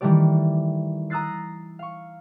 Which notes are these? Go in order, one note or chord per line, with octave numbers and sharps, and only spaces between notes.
D#3 E3 G3 A3 G4 D5
A#5 D#6 E6 F#6 A6 C7
F5 C#6